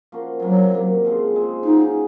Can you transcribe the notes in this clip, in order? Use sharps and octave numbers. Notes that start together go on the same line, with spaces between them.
F3 A#3 C#4 F#4
C3 D#3 F#3 A#3
C3 D#3 A#3
C#3 F3 G#3 C4
C#3 F3 G#3 C4
C#3 F#3 C#4 D#4 G#4